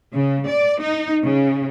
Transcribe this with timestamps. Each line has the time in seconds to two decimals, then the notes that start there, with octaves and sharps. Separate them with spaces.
0.15 C#3
0.48 D5
0.82 D#4
1.23 C#3